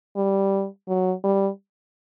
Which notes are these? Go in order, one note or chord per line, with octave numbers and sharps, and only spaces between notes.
G3
F#3
G3